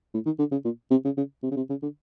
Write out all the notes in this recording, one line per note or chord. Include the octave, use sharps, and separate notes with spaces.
A2
D#3
D3
C#3
A#2
C3
C#3
C#3
C3
C#3
C3
C#3
D3